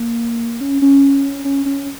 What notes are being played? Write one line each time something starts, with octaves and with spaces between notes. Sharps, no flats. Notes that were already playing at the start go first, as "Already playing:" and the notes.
Already playing: A#3
C#4
C#4
C#4
C#4